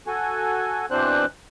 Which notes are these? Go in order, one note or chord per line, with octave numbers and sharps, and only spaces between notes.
F#4 A4 G#5
B2 E3 C4 D4 C5 F#6